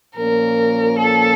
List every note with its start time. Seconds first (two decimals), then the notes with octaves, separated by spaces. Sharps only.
0.15 A#2 F3 A#3 C#4 A#4
0.98 A4